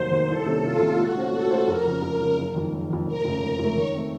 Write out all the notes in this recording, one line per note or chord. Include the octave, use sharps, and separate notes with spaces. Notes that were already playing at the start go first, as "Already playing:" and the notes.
Already playing: F1 D#2 D#3 F#3 C5
D#2 D#3 F#3
C2 A4
C3 D#3 A#3 C#4
C2 F4
C3 D#3 A#3 C#4
A#2 F#4
A3 C#4 F4 C5
A#2 A4
A3 C#4 F4 C5
F2 A#4
C#3 F3
F2
C#3 F3
F#1
F2 D#3
F#1
F2 D#3
F1 A#4
F2 C#3 A3
F1
F2 C#3 A3
D#3 C#5
A3 C4